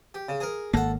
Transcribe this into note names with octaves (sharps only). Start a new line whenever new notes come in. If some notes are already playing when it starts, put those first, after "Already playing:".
G4
C#3
G#4 A#4
G#1 A#3 A4 F#5